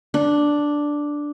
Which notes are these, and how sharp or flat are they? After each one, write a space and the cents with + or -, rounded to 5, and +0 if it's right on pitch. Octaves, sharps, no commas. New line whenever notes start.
D4 +0